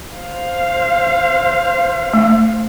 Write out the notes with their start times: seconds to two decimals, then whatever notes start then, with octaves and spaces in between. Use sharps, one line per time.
0.15 C5 F5
2.13 A3